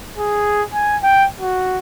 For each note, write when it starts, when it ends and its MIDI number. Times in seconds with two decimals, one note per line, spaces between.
0.18 0.63 68
0.73 0.97 80
1.03 1.25 79
1.40 1.78 66